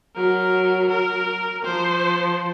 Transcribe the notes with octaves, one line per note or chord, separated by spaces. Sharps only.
F#3 A#4
A#4
F3 C5